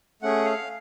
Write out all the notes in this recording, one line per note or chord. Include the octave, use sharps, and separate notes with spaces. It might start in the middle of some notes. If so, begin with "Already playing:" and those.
A3 C#4 G#4 F#5
F5